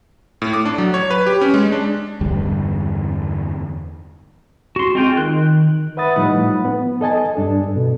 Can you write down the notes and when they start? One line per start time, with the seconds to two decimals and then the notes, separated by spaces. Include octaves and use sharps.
0.42 A2
0.53 D6
0.65 D4
0.78 F#3
0.94 C#5
1.11 B4
1.27 G4
1.41 C#4
1.54 G#3
1.72 D4
2.21 E2 G2 D3 G3
4.76 F#4 C6
4.95 G#3 C4 F4 G5
5.17 D#3 F#6
5.97 B4 E5 F#5 B5 D#6 A6
6.16 A2 F3 G3 D#4 F#5 B5
6.65 B3
7.01 A4 D#5 G#5 A5
7.36 G2 D4 A4
7.76 B2